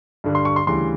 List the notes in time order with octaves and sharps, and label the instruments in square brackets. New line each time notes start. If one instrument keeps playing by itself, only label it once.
[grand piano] G2 D3 G3
C6
C#6
C6
D2 C#3 E3 G3 C6